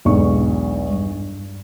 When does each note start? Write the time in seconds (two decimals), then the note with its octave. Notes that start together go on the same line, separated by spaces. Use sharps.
0.05 B1 E2 G#2 D4 C#6
0.90 G2